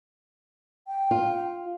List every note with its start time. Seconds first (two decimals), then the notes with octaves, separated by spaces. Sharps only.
0.88 G5
1.11 F4